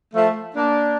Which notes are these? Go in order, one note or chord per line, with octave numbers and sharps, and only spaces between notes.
F3 A3
A#3 D4